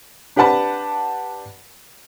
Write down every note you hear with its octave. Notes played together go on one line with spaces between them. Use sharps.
D4 G4 B4 F#5 A5 B5